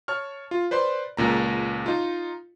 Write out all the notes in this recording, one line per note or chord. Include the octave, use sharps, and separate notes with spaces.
C#5 A5 C#6 F6
F4
B4 C5 D5 C6
C#2 A#2 A#5
D#4 F4